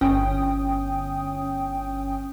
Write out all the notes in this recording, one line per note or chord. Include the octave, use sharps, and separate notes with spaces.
G1 C#4 G5 D#6